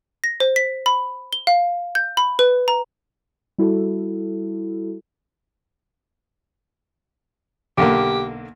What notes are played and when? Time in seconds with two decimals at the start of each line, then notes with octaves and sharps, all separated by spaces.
0.24 A#6
0.40 C5
0.56 B6
0.86 B5
1.33 G7
1.47 F5
1.95 G6
2.17 B5
2.39 B4
2.68 A#5
3.58 G3 E4 F#4 A4
7.78 B1 D3 A#3 G4